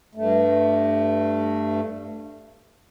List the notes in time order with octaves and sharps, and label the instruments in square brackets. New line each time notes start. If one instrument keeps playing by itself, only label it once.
[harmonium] G2 A3